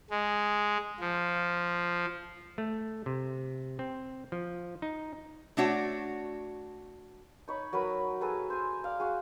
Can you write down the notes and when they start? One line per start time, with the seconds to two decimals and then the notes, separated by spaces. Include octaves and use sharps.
0.11 G#3
1.00 F3
2.58 A3
3.06 C3
3.79 C4
4.32 F3
4.82 D#4
5.57 A3 D4 F#4 C#5 D5
7.48 D#4 C#5 B5
7.73 F#3 A#4 B4 B5
8.21 G#4 A4 B4 A#5
8.50 C5 G#5
8.84 D5 F5
9.00 F#4 G#4